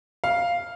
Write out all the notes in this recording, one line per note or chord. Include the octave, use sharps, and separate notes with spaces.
F5